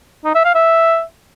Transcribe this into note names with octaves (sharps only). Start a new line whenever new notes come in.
D#4
E5
F5
E5